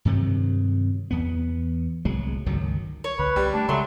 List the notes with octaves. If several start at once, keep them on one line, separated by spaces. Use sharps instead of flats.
G2 C3 D#3 F#3
E2 B3
D1 C2 F#3 G#3
G1 C#2 D#3 F#3
C#5
C#2 D3 B4
C2 G3
A3 D4
C#3 F#3 G#3 A3 E5 C6